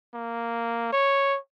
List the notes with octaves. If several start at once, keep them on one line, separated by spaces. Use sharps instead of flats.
A#3
C#5